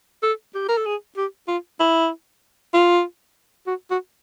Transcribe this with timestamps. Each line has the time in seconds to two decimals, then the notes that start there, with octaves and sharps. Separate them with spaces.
0.23 A4
0.55 G4
0.69 A#4
0.78 A4
0.86 G#4
1.17 G4
1.48 F4
1.80 E4
2.74 F4
3.67 F#4
3.91 F#4